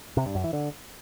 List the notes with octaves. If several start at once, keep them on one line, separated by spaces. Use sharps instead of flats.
C3
G2
F#2
E3
D3